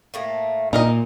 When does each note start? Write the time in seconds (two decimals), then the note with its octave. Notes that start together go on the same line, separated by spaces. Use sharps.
0.14 A2 A3 A#3
0.73 A#2 D#4 A#4 D#5